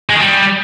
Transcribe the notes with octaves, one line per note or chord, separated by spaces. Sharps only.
G#3
D#3
G3